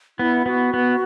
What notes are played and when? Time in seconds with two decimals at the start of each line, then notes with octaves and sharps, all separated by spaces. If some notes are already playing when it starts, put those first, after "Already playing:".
0.19 B3 E4
0.46 B3 F#4
0.74 B3